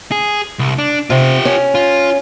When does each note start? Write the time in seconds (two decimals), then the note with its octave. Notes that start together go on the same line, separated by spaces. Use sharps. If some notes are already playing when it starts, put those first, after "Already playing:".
0.12 G#4
0.59 C2
0.78 D4
1.10 C3 F4 G4
1.45 C#4
1.75 F4